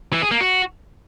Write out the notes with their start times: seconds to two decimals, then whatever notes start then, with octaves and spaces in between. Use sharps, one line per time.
0.13 E3
0.22 G#4
0.31 A#3
0.41 F#4